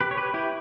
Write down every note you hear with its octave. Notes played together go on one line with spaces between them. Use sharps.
G4 B4
C#5
G4 B4
E4 G4